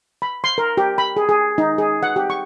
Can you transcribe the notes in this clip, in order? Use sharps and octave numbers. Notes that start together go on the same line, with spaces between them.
B5
C6
A#4
G4
B5
G#4
G#4
D#4
G#4
F#5
G4
C#6